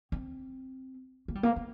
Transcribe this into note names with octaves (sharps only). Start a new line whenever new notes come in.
C4
A#3
G3
A#3
C4